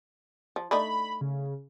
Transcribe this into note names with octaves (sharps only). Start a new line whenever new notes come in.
F3
A3 D4 D#4 B5
C#3